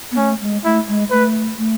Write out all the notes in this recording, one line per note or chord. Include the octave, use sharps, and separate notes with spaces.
B3
A3 C#4
G#3
A3 E4
G#3
A3 B4
A3